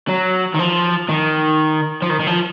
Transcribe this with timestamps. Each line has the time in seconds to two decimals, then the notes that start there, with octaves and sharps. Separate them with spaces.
0.08 F#3
0.54 D#3
0.59 F3
1.09 D#3
2.02 F3
2.10 D#3
2.20 D#3
2.27 F3